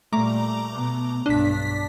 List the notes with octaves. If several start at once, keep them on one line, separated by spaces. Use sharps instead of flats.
A#2 G3 A3 A#5 D6
B2 B3
B1 G2 D4 B6